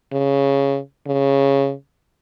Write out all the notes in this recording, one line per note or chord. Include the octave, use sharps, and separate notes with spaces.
C#3
C#3